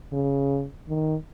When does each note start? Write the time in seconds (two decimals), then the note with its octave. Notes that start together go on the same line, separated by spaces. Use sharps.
0.13 C#3
0.89 D#3